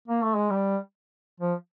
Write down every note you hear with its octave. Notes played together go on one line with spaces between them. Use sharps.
A#3
A3
G#3
G3
F3